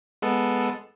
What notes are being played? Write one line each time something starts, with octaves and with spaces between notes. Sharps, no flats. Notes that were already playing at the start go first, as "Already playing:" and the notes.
G#3 B3 A4